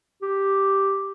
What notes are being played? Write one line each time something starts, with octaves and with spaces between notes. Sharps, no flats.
G4